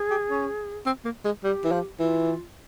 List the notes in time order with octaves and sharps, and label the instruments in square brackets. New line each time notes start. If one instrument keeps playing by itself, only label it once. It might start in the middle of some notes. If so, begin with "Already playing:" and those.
Already playing: [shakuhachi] G#4
[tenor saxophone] G4
C#4
C4
A#3
G#3
[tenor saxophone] G3 [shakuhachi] G4
[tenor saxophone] E3
F3
[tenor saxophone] E3 [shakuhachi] F4